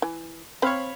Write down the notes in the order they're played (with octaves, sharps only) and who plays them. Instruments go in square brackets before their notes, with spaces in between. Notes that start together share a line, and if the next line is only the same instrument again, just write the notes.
[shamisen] E3
[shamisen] C4 C5 [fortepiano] C#5 F5 B5